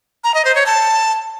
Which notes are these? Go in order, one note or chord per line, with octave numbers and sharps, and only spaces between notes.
A#5
D#5
C5
C#5
A5